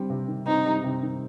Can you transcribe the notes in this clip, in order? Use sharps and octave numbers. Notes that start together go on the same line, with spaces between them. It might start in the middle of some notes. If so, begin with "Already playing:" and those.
Already playing: G3 C4
C3
D#3
C4 D#4
G3
C3
D#3